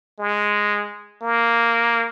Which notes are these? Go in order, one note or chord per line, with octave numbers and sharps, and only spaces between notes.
G#3
A#3